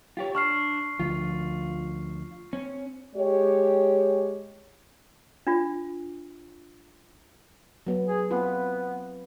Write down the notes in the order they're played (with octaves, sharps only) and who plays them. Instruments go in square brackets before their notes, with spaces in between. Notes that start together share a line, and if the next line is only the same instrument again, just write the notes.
[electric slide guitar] F4 G4 C#5
[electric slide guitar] D4 [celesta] C#6 F6 C7
[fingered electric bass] D2 F3 [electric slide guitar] F4
[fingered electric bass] C4 [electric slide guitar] C#4
[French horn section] G#3 G4 C#5
[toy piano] D4 F4
[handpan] F#3 B3
[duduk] G#4
[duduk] B3 [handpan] C4 F4 B4